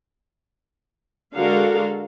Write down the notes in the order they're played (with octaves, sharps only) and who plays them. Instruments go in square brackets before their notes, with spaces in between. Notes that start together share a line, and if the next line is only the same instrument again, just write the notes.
[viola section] D3 G#3 F#4 A4 A#4 F5